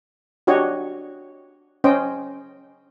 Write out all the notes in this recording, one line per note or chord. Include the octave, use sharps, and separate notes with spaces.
D4 F#4 G4 C#5 D#5
C#4 C5 D#5 G5